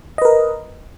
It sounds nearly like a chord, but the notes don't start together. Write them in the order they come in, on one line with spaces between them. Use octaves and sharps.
D#5 B4 A#4